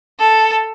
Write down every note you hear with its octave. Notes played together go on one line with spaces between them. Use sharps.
A4